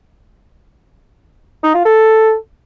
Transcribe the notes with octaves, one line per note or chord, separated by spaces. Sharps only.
D#4
F4
A4